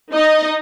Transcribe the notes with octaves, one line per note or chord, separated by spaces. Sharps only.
D#4 D#5